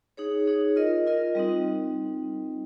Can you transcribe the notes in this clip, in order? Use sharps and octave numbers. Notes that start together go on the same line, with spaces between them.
D#4 G#4 C#5
D#4 G#4 C#5
F4 A#4 D#5
F4 A#4 D#5
G3 C4 D#4